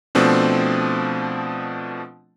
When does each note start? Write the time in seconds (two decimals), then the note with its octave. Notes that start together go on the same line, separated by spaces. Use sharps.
0.15 B2 F3 A3 C4 D4